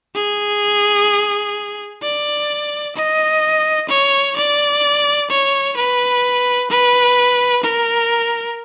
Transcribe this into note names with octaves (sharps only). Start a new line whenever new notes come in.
G#4
D5
D#5
C#5
D5
C#5
B4
B4
A#4